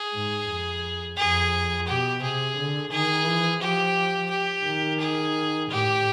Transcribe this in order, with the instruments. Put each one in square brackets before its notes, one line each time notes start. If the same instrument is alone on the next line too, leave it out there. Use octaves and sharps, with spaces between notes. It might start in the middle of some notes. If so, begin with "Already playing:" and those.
Already playing: [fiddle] G#4
[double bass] G#2
F2
[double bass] F2 [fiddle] G#4
[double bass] B2 [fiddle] G4
[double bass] C3 [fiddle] G#4
[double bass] D3
[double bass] D#3 [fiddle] G#4
[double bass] E3
[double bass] F3 [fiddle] G4
[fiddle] G4
[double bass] D#3
[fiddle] G#4
[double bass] A2 [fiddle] G4